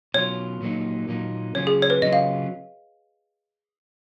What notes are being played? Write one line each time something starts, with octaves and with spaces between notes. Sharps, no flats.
B2 F#3 C#4 F4 C#5
A#2 F#3 A#3 D#4
A#2 F#3 A#3 D#4
C#3 F#3 C#4 F4 C#5
G#4
C#5
B4
C#3 F#3 C#4 F4 D#5
F5